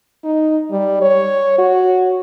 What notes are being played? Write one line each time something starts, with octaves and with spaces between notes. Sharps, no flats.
D#4
G3
C#5
F#4